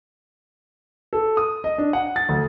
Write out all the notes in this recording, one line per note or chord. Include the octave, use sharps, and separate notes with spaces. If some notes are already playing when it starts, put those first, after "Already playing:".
A4
D#6
D#5
D4
F#5
A6
D2